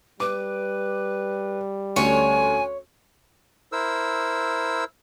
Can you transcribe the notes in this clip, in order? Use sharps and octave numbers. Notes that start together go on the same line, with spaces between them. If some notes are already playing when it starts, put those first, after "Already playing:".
G3 B4 D6
D2 A3 C#4 C#5 G#5
E4 A#4 C5 E6